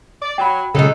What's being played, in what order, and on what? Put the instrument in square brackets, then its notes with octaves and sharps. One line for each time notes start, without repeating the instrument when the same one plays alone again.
[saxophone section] D5
[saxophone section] F#3 [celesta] G5 B5
[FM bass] C#3 [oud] F#3 G#3 [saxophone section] D#4 F4 A4